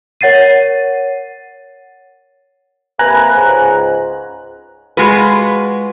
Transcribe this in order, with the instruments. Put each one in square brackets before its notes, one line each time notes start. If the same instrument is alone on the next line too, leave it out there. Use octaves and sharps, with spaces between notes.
[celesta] A#4 C#5 F#5 A6 C7 D#7
[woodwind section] C3 A#3 B4 [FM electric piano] G#5 A#5 F#6
[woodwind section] C#2 G#2
[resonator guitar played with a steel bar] G#3 F4 F#4 B4